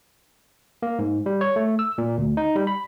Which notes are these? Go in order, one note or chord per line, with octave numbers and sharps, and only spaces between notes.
A#3
G#2
G3
C#5
A3
E6
A#2
D2
D#4
G3
B5